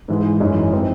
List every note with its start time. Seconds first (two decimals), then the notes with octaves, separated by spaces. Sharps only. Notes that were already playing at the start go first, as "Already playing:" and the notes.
0.08 G#2 E3 G#3
0.40 F#2 E3 G#3 D#4
0.73 E3 C4 D#4